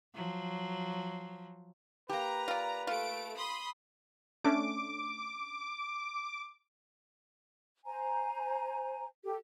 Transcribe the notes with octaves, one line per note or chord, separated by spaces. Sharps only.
F3 F#3
A#3 G4 B4 A#5
F4 D5
A3 F4 D7
B5 C6 D#6
A3 C#4 D4 D6
C5 G#5 A#5
G4 A4